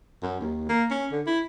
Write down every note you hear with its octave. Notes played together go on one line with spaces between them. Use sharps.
F#2
D#2
A#3
C#4
D3
E4